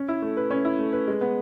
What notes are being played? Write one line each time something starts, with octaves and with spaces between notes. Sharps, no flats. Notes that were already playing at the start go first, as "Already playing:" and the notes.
Already playing: C#4
E4
A3
B4
C#4
E4
A3
B4
G#3
B3